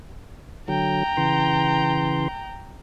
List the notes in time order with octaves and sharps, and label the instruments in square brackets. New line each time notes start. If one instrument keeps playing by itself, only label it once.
[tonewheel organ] D3 F#3 [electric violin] G5 A#5
[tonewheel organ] C#3 E3 C6